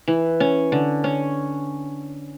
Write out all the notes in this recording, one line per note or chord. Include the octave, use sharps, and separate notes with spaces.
E3
C#4
D3
C#4